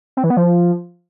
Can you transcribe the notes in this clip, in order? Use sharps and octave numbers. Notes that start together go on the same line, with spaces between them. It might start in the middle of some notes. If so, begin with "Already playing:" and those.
C4
E3
B3
F3